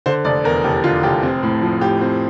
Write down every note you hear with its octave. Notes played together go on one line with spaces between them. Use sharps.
D3 C5
F1 D5
E2 A#4
F1 G4
D3 F4
F1 G4
C4
A2
F3
A2 G4
C4